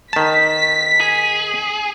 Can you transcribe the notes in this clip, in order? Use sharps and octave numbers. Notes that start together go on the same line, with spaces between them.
D#3 A5 B6
G#4